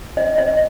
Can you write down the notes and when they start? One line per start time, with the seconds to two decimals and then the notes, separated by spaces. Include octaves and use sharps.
0.17 D#5
0.38 D#5